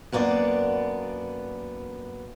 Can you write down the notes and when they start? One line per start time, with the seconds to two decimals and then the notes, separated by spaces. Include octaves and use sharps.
0.12 F#2 A#3 B3 D4 D5